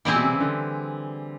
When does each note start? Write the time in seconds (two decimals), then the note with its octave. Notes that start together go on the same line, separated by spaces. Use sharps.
0.05 A#2 E3 G3 C4 E4 G#4
0.14 B2
0.23 C3
0.32 C#3
0.40 D3